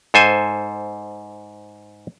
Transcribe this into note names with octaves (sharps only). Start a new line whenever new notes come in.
G#2 A4 C5 G#5